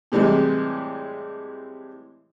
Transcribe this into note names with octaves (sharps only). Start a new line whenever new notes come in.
A2 C3 E3 G3 G#3